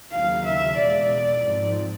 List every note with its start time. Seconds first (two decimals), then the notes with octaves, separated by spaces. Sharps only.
0.12 D#2 C#3 F#3 A#3 F5
0.45 E5
0.77 E2 B2 G#3 D5
1.41 G#2 F3 G#3 C4